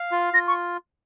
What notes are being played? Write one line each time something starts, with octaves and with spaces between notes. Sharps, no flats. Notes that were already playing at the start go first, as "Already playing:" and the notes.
Already playing: F5
F4
F4 A#6
C#6